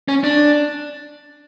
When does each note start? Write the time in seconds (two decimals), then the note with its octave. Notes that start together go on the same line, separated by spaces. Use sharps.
0.08 C#4
0.24 D4